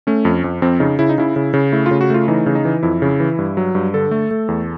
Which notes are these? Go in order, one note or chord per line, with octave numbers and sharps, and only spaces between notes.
A3 C#4
F2
F2
F2 C4
C#3 D#4
C#3 E4
D#4
C#3 E4
C#3
C#3
A3 E4
F4
C#3
F#4
A3 F4
E3 D#4
C#3
D#4
E3
F2 E4
C#3
E3
G2
F#3
G2
D3 A4
A3
A3
E2